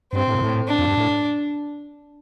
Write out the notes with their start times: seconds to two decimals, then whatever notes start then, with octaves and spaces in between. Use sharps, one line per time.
0.13 G2 C4
0.28 A2
0.35 A#2
0.42 A2
0.68 D4
0.79 F2
0.88 G2
0.98 A2